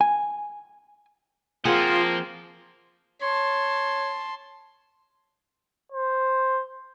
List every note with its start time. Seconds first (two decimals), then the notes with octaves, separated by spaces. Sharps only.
0.01 G#5
1.65 F3 A#3 C4 F4 G#4 F#5
3.21 C#5 A5 C6
5.92 C5